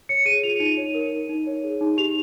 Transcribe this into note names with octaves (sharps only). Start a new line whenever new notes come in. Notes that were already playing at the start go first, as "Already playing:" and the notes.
C#5 C#7
G#4 D#7
F4 F7
D#4 D#7
C#5
A#4
D#4
D#4
C#5
G#4
D#4
G4 F7